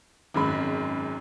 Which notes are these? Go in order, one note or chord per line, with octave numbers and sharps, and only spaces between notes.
G#1 F#2 G#3 B5